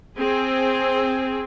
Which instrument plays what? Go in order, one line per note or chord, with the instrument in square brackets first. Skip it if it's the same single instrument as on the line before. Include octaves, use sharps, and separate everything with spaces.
[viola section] C4 G#4